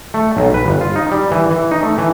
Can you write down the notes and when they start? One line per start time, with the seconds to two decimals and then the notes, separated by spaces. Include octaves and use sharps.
0.14 A3
0.37 B1
0.54 B4
0.66 G1
0.81 F4
0.96 D#4
1.11 G3
1.31 E3
1.51 E3
1.71 D#4
1.83 A3
1.98 E3